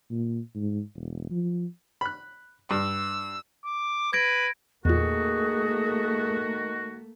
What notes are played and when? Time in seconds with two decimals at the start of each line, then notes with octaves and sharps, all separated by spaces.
0.11 A#2
0.55 G#2
0.95 E1
1.31 F3
2.01 B5 F#6
2.71 G2 E6
3.65 D6
4.13 B4 G#6 A#6 D7
4.85 E2 A#2 D#3 A3 A#3 F#4 G#4